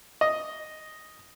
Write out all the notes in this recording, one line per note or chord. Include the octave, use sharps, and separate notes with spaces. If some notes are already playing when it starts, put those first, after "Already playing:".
D#5